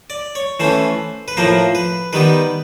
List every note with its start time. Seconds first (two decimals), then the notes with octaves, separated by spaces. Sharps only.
0.10 D5
0.35 C#5
0.60 E3 A3 C#4 C5
1.28 B4
1.37 A2 F3 A#3 C5
1.75 B4
2.13 D#3 G3 B3 B4